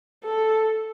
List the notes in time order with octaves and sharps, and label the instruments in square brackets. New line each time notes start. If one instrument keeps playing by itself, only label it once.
[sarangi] A4